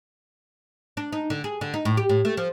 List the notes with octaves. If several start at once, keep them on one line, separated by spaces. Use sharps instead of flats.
D4
D#4
D3
G#4
D3
D#4
A2
G4
A2
A3
F3